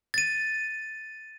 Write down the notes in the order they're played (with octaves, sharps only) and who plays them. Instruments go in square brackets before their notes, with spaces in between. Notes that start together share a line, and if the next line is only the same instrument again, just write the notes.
[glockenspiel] A6 D#7